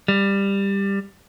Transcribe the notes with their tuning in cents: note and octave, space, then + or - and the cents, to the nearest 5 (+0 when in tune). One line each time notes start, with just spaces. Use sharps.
G3 +15